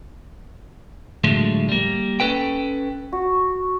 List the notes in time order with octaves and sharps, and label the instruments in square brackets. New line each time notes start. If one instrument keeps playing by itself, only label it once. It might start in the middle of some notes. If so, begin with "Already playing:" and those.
[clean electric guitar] A2 D3 F3 F#3 G#3 A3
G3 A#3
C#4 A4 B4 G5
[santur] F#4